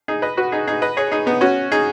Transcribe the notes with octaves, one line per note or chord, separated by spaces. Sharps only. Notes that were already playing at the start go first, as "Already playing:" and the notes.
D#4 G#4
B4 D#5
F#4 B4
D#4 G#4
D#4 G#4
B4 D#5
G#4 C#5
D#4 G#4
B3 D#4
C#4 F#4
D#4 G#4